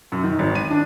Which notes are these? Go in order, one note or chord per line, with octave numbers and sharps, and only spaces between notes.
F#2
D#3
G#1
D#7
D4